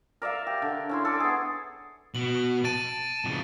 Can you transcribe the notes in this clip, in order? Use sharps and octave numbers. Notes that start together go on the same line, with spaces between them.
A#4 D5 E5 F5
G4
D3
C#4 E4 C6
A4 D6
B3 G#4
B2 F#7
A5 A6 D7 D#7
F2 C#3